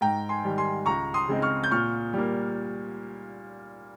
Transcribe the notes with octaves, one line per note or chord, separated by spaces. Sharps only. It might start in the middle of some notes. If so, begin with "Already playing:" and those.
G#2 G5 A#5
G#5 C6
D#3 G3
G#5 C6
C#2 A#5 C#6
C6 D#6
C#3 G#3 C4 D#4
C#6 F6
G6
A#2 C#6 F6
G3 A#3